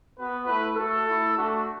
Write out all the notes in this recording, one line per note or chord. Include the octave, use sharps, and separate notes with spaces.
B3 F#4 B4
A3 E4 B4
A3 F#4 A4
A3 E4
A3 D4 F#4